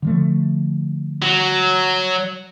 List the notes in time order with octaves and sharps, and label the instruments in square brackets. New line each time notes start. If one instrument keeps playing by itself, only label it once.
[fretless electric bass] D3 F3 A3
[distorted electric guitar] F#3